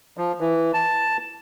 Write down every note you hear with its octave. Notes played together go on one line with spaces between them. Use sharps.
F3
E3
A5